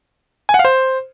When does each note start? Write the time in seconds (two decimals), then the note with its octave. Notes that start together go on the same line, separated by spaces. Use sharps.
0.49 G#5
0.54 F#5
0.59 F5
0.65 C5